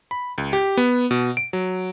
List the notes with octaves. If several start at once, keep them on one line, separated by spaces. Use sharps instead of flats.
B5
C#2
G4
B3
B2
D7
F#3